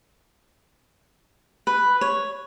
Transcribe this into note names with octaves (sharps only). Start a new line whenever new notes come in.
B4
C#5